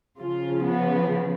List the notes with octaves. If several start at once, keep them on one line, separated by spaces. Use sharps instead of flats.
C#3 F3 F4
B3